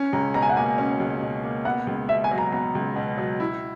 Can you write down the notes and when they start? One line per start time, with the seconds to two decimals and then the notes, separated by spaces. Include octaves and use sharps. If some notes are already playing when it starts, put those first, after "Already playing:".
Already playing: C#4
0.13 C#2 A#5
0.34 B2 A#5
0.42 G#5
0.49 F#5
0.56 A#3 G#5
0.78 C#4
1.00 C#2
1.21 B2
1.43 A#3
1.65 B3 F#5
1.87 C#2
2.09 B2 E5
2.24 G#5
2.31 F#3
2.38 A#5
2.52 B3 A#5
2.75 C#2
2.96 B2
3.18 F#3
3.40 E4